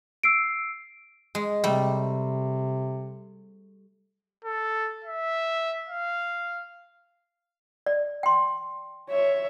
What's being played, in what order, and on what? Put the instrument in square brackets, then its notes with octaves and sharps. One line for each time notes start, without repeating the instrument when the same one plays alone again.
[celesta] E6 C7 D7
[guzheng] G#3
[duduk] C3 [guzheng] G3 A3
[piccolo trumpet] A4
E5
F5
[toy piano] D5
G5 C6
[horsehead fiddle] C#5 E5